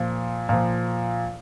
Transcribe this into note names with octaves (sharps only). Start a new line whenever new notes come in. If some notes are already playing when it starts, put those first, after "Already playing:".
Already playing: A#2 F3
A#2 F3